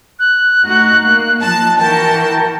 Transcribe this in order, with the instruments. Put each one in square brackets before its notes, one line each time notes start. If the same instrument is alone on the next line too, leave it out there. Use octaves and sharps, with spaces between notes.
[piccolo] F#6
[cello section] A3 D#4 F#4
A#3
[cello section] F3 D#4 [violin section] A5
[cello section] E3 F#4 A#4 [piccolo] G5 [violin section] A5